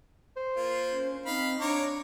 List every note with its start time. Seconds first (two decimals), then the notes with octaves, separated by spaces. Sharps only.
0.36 C5
0.57 A#3 F4
0.91 C#4
1.26 C4 D#4 F5 B5
1.61 D4 C#5 A#5 D6